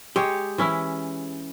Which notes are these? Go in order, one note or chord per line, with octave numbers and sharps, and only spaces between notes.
G#3 G4 C#5
E3 C#4 E4